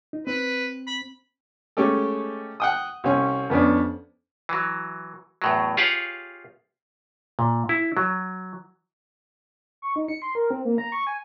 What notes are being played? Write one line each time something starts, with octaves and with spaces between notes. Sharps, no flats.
D#4
C4 B4
B5
G#3 A3 C#4 G4 A4
F#5 G5 D#6
C2 C#4 C#5
F2 B3 C#4 D4
E3 F#3
E2 A2 F#3
F4 G4 G#4 C#5 F5 F#5
A#2
E4
F#3
C#6
D#4
C#7
C6
A#4
C4
A#3
A#5
C#6
G#5